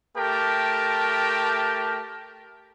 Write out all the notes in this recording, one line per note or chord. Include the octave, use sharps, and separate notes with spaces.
A3 G4 A#4 G5 A5